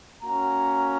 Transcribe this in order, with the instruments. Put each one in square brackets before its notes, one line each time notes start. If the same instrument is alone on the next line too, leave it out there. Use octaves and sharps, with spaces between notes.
[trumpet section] A#3 C#4 F#4 A#5